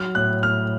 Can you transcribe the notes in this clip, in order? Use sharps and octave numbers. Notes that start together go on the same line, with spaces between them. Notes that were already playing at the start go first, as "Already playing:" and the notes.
Already playing: F#3 F6
A2 F#6
A2 F6